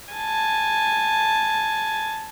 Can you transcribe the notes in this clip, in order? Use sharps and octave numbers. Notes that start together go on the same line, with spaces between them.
G#5 A5